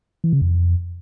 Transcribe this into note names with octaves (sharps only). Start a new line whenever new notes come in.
E3
C#3
F2